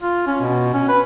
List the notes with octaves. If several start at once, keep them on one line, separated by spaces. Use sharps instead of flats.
F4
C#4
B2
C#4
B4